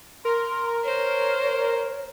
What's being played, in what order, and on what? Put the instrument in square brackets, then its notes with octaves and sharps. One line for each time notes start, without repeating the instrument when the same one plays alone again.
[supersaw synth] A#4 [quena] C6
[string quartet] C5 [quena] C#5